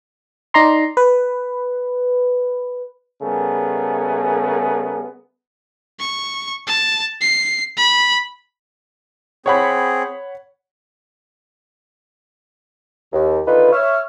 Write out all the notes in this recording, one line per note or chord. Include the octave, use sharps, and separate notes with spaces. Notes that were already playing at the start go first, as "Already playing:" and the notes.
D#4 D5 A#5 C6
B4
C#3 G3 A3 B3 G#4 A#4
C#6
A5
C7
B5
C4 G#4 C#5 F#5 B5
D#2
D3 D#3 D#4 F4 B4
C#5 E5 F6